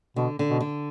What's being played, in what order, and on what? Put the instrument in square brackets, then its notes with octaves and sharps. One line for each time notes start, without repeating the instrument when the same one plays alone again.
[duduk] B2 [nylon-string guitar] D3
[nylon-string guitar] D3
[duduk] B2
[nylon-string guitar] D3